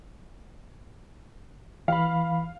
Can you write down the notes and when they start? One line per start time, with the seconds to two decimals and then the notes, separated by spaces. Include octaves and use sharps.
1.88 E3 F5 B5